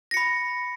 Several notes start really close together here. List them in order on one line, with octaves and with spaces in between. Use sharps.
A#6 C#7 B5